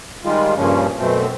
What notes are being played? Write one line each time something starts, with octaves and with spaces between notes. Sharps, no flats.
D#3 G3 G#3 F4
G2 A#2 C#3 F3 C#4
F#2 B2 A3 C4